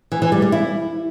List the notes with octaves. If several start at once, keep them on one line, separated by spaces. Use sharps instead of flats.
E3
E3
G3
G3
E4